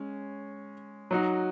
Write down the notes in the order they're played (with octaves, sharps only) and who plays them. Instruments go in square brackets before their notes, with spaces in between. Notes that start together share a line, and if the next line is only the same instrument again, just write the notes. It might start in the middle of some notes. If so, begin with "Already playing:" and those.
Already playing: [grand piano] G#3 C#4
F#3 D#4 F#4